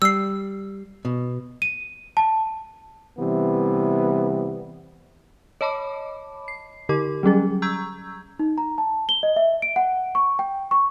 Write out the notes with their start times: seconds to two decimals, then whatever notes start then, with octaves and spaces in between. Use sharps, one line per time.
0.02 G3 E6 C7
1.05 B2
1.62 D#7
2.17 A5
3.18 C3 E3 G3 B3
5.61 C#5 D#5 A5 B5 D6
6.48 C7
6.89 D3 G4 A#4 D6
7.23 F#3 G3 C#4 G#4
7.62 A#5 C#6 E6 G6 G#6
8.39 D#4
8.58 A#5
8.78 A5
9.09 G7
9.23 D#5
9.36 E5
9.62 D7
9.76 F#5
10.15 C#6
10.39 G5
10.71 C#6